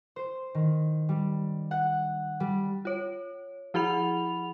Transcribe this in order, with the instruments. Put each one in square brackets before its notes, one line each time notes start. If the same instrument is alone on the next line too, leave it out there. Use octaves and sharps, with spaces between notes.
[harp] C5
D#3
G3
F#5
G3
[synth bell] F4 C#5
F3 E4 G#4 F#5 B5 F7